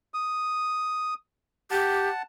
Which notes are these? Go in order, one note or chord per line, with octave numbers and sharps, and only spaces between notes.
D#6
G4 F#5 A5